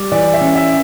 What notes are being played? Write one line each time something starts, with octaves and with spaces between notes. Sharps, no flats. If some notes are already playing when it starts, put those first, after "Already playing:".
Already playing: G3
E3 D5
E5
C#4
E5